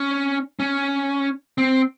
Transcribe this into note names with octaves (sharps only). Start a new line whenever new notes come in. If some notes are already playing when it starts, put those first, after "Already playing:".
Already playing: C#4
C#4
C4